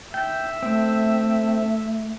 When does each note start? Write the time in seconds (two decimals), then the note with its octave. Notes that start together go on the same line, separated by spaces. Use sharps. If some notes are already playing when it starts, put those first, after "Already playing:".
0.14 E5 G5
0.63 A3 C4